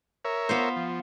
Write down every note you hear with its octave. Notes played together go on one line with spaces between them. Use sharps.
A#4 C#5 E5
B3 F4 C5
F3